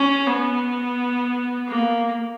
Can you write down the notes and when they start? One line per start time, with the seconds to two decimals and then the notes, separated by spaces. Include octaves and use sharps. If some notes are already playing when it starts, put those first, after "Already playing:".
Already playing: C#4
0.27 B3
1.68 A#3